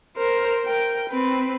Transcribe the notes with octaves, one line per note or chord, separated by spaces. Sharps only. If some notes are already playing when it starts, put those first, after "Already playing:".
A#4 C5
A#4 G5
C4 B4